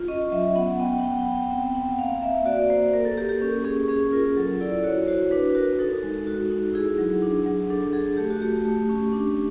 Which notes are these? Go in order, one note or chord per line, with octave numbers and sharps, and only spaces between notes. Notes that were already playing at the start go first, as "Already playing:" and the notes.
Already playing: F4
C#4 D#5
F#3 E5
B3 F#5
B3 G5
F#5
B3 G5
G5
B3
G5
C4 G5
C4 F#5
A#3 F5
A#3 E5
F#4 D5
A#3 C5
A#3 A#4
A4
A#3 G4
G4
C#4
C#4 G#4
C#4 G#4
F4 A#4
F#3 A4
E4 D5
F#4 C#5
F#4 C5
D4 B4
F#4 A#4
D#4 A4
G#3
F#4
D#4
E4 G#4
F#3
D4
F#3
D4 A4
A4
F#3 G#4
A3 G4
F#4
A3 G4
A3
C#4
D4